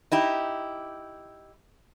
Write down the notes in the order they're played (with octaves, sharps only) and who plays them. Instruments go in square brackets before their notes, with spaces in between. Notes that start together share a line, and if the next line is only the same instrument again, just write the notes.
[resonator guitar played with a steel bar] D#4 E4 G4